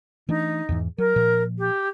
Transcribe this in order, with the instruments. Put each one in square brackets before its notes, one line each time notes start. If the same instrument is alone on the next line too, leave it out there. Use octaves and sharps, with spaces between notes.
[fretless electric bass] E3 A3 D4 [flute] D#4
[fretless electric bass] E2 G#2 E3
[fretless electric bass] F#3 [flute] A#4
[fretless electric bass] A#2 F3
[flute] G4